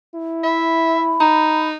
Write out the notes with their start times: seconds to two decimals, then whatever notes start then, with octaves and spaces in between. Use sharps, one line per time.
0.15 E4
0.44 E5 B5
1.20 D#4 A#5